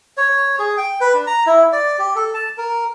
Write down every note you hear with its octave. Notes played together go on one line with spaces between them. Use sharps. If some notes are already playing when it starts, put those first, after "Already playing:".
C#5
G#4
G5
B4
D4
A#5
E4
D5
G4
A4
A5
A#4